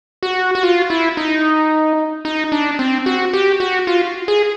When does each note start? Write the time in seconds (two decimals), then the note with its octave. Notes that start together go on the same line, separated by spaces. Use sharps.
0.23 F#4
0.55 F#4
0.63 F4
0.90 E4
1.17 D#4
2.25 D#4
2.52 D4
2.79 C4
3.06 F#4
3.33 G4
3.60 F#4
3.87 F4
4.28 G#4